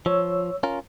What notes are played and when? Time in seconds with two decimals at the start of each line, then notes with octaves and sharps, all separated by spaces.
0.06 F3 C#5 E6
0.63 C#4 F4 A#4